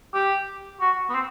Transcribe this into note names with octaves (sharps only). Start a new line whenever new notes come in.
G4
F#4
B3
C4